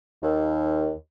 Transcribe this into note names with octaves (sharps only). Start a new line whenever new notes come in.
D#2